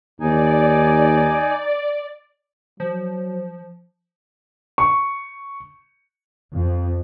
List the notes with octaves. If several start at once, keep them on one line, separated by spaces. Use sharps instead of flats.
D#2 D#4 D5 G#5
F3 F#3
C#6
F2